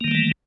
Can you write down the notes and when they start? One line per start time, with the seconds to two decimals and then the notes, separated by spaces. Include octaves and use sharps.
0.01 A#3
0.04 D#3
0.08 G3
0.11 A3
0.15 E3